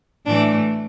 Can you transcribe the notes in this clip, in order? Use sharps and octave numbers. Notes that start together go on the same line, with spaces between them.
A2 E3 A3 D4